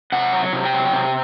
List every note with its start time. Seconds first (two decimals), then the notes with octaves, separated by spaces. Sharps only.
0.12 C3 F#5
0.33 F#3
0.53 C3
0.65 G5
0.73 F#3
0.93 C3